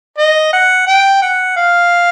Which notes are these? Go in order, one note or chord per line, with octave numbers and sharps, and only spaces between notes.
D#5
F#5
G5
F#5
F5